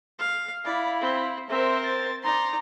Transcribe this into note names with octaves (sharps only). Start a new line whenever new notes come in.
F5
E4 D5 F5 B5
C4
C4 A#4 C5 E5
A6
D#4 D5 A#5 C6